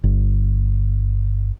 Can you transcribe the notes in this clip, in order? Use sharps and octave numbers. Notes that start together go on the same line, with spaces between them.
G1